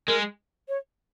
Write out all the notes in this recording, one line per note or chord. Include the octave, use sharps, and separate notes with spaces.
G#3 A#4
C#5